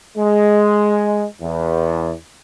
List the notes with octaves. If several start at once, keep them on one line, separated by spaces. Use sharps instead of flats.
G#3
E2